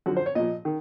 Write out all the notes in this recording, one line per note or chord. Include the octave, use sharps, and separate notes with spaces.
F#2 D3 F3 F#4
C5
C#5
A#2 F3 D#5
D#3